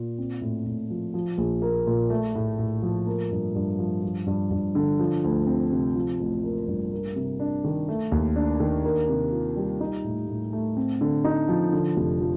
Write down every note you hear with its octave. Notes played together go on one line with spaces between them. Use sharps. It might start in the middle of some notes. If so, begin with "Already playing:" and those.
Already playing: A#2
C4
A2
A2
F3
F3
A#1
A#3
A#2
A3
A2
A2
F3
A#3
G2
G2
F3
F3
G2
G2
D3
F3
D2
C4
C3
F3
A1
A#3
G2
A#3
C3
D4
D#3
A3
D#2
D4
D#3
A#3
C3
F4
G3
D#4
A2
A2
A3
C4
D3
D#4
F3
D3
F1
F3